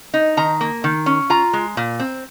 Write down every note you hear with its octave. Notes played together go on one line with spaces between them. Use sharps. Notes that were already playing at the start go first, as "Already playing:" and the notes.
D#4
D#3 A#5
A#3
D#3
C#4
F4 A#5
G#3
A#2
C4